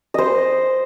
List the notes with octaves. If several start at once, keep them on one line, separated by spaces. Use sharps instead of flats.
C5 D#5